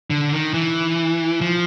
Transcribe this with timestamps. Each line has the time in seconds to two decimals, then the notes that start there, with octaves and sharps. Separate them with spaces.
0.10 D3
0.32 D#3
0.54 E3
1.41 F3